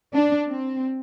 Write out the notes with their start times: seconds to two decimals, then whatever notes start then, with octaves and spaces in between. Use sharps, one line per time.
0.12 D4
0.48 C4